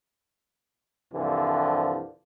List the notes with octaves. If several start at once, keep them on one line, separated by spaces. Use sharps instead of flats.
C2 G2 D3 E3 F3